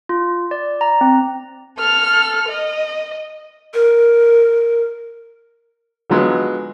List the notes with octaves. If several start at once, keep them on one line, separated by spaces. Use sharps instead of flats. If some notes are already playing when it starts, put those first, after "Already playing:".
F4
D5
A#5
C4
A4 F6
D#5
A#4
D3 F3 F#3 G#3 B3